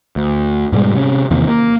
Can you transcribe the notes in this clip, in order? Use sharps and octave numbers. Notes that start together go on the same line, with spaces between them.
D2
G#2 B2 G3 G#3
C3 C#4
E2 C3 D#3 A#3
A#3